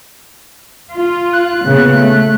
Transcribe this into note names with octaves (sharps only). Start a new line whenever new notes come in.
F4
F#6
A#2 C#3 B3
A3